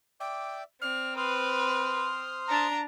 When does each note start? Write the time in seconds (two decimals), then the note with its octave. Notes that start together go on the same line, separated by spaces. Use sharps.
0.20 D5 E5 G5 D6
0.82 C4 D5 F6
1.17 B4 C5 C6 D#6 F6
2.49 D4 A5 A#5